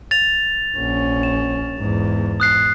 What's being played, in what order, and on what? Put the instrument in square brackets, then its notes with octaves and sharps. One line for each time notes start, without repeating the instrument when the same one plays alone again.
[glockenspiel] A6 F7
[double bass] A#1 C#4
[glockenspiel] E7
[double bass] E2 G#2
[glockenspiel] D#6 F#6 C7